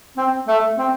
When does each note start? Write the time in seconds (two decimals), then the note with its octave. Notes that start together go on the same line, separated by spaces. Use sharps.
0.17 C4
0.48 A3
0.78 C4